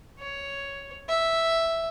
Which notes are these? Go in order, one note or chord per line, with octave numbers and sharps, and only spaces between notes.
C#5
E5